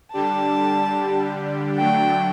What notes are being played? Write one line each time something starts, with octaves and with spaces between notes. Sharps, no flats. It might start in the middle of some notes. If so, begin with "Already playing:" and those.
D3 G3 D4 G4 A5
D3 F#3 A3 D4 G5